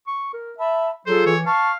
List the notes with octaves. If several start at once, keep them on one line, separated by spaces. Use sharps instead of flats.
C#6
A#4
E5 A5 B5
F#3 F4 G#4 A4 C5
E3 C#5
F5 A5 C#6